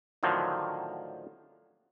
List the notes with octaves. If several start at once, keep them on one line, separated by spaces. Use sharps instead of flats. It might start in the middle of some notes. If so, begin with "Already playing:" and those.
A2 D3 D#3 F3 F#3